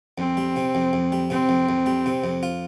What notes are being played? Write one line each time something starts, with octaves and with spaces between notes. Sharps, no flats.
F2 C4
G3
C3
F2
F2
G3
C3 C4
F2
F2
G3
C3
F2
F4